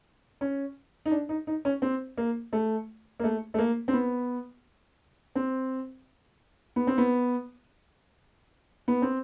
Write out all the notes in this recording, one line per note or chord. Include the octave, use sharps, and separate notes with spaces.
C#4
D#4
D4
D#4
D#4
C#4
C4
A#3
A3
A#3
A3
A3
A#3
C4
B3
C4
B3
C4
B3
B3
C4